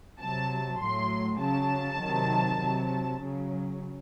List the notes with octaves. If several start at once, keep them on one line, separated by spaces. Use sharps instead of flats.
C3 F#3 A5
A2 F#3 C6
C#3 F#3 A5
C3 D#3 F#3
C3 F#3
C#3 F#3